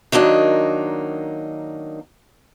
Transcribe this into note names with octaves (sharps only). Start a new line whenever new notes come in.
D#3 F#3 A#3 D4 D#4